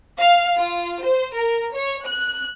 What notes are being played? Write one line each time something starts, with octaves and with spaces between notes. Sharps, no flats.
F5
F4
C5
A#4
C#5
F#6